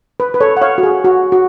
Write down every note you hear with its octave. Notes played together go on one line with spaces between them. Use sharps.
B4
B4
A4 C#5
F#5
C#5 F5
F#4
G#4
F#4
F#4